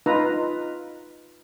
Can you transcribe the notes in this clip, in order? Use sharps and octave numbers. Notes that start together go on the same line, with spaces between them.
D#4 F4 B4 A#5